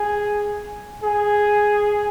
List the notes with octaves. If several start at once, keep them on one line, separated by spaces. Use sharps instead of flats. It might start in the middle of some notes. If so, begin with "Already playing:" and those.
Already playing: G#4
G#4